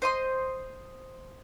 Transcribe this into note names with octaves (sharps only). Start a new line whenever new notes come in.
C5 D#5 C6